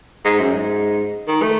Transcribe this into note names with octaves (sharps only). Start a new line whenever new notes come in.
G#2
F#2
G#2
D#3
A3